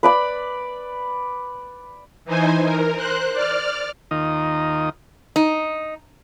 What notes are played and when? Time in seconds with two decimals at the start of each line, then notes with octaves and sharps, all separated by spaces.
0.03 B4 D5 B5
2.25 E3 D#4 C5 G#5
2.65 A#4
2.97 C5 F#6
3.33 D5 F6
4.11 D#2 D#3 D#4 F4 A#4 D#6
5.36 D#4